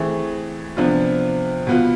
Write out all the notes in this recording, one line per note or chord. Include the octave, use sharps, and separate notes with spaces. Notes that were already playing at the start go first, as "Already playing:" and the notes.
Already playing: E3 A3 C4 G#4
C3 F3 B3 D4 F4
B2 B3 F4